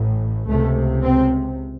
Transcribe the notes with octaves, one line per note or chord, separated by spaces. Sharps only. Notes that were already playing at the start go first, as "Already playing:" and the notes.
Already playing: A1 A2
C#2 C3 A3
C4